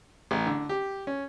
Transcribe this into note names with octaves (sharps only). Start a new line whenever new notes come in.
A1
D3
G4
C#4